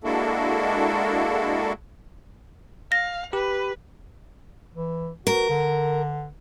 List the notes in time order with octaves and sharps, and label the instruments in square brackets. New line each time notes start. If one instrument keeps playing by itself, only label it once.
[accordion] G#3 A#3 D4 E4 F#4 A4
[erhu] F5 [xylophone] A#6
[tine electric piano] G4 [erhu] B4
[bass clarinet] E3
[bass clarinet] F#4 [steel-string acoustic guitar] A#4
[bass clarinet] D3